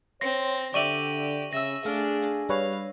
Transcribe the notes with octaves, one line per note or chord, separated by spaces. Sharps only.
C4 C#5 C6 A#6
D3 G4 D5 E5 C#6 D#7 F#7
C#3 E5 E6 A#6
A3 D4 G#4 F5
G3 B4 C#5 F5